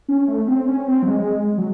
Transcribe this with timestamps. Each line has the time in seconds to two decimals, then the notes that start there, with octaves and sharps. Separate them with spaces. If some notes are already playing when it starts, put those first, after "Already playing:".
0.09 C#4
0.28 A3
0.48 C4
0.67 C#4
0.88 C4
1.02 F#3
1.07 G#3
1.58 F#3